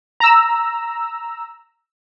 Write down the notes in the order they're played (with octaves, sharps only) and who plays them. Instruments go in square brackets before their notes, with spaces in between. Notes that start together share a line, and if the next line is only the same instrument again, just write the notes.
[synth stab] A#5 E6